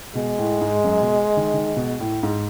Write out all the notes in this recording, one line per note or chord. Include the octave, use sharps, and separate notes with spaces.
B2 G#3
A2
G#2
F#2
B2
D#3
D#3
B2
A2
G#2